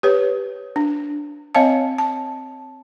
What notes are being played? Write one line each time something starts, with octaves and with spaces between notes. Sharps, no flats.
G4 B4 C#5
D4
C4 C#5 D#5 F5 A5
A5